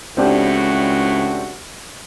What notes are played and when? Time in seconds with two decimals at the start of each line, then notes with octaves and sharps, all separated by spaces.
0.17 C#2 A2 E3 C4 D4 F#4 G4